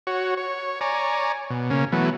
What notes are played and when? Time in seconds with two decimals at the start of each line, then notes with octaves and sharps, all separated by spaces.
0.07 F#4 C#5
0.37 C#5
0.81 C#5 D5 G#5 A#5
1.50 B2
1.71 C#3 A#3 C#4
1.92 E3 F#3 A3 B3